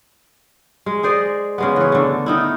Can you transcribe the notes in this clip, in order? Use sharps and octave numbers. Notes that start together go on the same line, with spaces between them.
G#3
G#4 C5 D5 D#5
C#3 G#3 B3
E3 C#5
D3 A3
D#3 D#4 E4